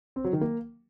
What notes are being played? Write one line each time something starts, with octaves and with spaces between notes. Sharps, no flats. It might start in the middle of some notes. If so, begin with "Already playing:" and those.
C4
F#3
D#3
A#3